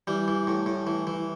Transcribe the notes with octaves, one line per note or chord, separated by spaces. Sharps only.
E3 G3
E3
A2
A2
E3
E3